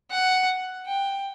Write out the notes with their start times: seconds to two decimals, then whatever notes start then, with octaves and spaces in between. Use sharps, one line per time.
0.11 F#5
0.86 G5